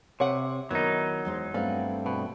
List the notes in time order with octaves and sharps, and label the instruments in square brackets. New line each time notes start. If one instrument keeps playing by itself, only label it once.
[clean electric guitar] C3 [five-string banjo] C#5 F#5
[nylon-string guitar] D#3 B3 E4 [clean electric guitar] F#3 D#4
[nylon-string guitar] E2 G#3 C5
[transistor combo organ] G2 A3 C4 [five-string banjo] B3 [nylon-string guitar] D5 F5
[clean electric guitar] B2 [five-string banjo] B3